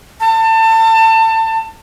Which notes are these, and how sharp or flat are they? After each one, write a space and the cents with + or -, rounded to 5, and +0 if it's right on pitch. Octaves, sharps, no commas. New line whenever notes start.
A5 +30